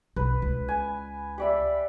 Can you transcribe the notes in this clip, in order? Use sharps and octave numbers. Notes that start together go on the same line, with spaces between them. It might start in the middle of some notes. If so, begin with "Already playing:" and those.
B1 B4
C#2
G#5
G3 D5 E5